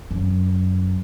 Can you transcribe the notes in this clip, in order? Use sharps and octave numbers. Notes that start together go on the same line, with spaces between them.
F#2